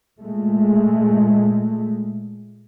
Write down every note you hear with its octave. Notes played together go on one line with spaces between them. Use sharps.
A#2 G#3 A3